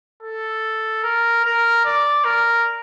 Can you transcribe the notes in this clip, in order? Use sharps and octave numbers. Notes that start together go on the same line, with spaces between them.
A4
A#4
A#4
D5
A#4